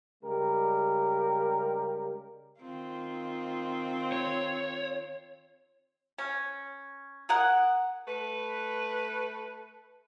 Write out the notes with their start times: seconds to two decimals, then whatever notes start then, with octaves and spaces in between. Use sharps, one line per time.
0.24 C#3 G3 G#3 G4 A#4
2.60 D#3 C4 F4
4.12 C#5
6.18 C#4
7.29 G#4 A#4 F#5
8.06 A3 B4